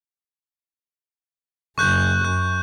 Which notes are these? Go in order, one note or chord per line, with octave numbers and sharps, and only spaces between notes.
F#1 C#6 F#6 G6
F#2 F#6